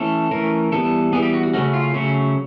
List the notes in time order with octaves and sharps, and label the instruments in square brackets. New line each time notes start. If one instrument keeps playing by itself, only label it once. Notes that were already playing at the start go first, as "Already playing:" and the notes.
Already playing: [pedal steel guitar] E3 A3 C#4 A4
E3 A3 C#4 A#4
E3 G3 B3 A4
E3 G3 B3 G#4
G4
F#4
F#4
C#3 F#3 A3 C#4 F#4
F4
C#3 F#3 A3 C#4 F#4